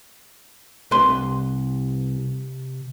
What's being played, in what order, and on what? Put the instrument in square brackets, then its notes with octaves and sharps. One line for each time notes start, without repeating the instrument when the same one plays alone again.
[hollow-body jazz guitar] C2 B4 C6 [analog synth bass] C3